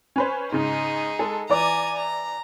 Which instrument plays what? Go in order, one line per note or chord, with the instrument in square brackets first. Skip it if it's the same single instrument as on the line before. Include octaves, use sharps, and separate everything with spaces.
[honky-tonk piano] C#4 B4 C5
[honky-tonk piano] G#2 C#3 [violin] D#4 G#4
[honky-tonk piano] G#3 A4
[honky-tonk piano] E3 D5 D6 [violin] G#5 A#5
[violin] A#5